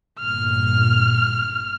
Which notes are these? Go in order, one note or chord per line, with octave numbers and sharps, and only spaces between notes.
G1 A#2 F6